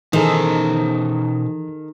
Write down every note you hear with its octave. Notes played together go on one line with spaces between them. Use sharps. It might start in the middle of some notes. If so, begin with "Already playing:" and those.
B2 D#3 E3 D#4 G#4 A4 C5